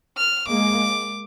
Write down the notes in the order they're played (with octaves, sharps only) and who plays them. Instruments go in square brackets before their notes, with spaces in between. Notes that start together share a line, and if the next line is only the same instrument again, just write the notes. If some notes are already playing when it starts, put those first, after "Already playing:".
[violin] F6
[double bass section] G#3 A#3 [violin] D6